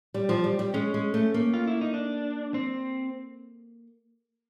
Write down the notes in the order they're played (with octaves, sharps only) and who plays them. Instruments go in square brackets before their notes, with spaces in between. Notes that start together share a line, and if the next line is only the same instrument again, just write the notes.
[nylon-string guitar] G3
F3
G3
G3
[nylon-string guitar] G#3 [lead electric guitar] C#4
[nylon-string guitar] G#3
A3
A#3
[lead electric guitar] F4
E4
D#4
D4
C4